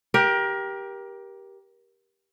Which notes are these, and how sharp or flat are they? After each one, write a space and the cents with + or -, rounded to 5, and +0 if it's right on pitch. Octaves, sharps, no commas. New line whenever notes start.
G4 +0 A#4 +25